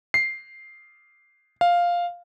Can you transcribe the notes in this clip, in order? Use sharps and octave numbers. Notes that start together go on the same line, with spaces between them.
C7
F5